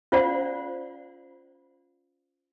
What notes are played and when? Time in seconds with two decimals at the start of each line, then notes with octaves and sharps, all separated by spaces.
0.12 C#4 F4 C5 D5 F5 F#5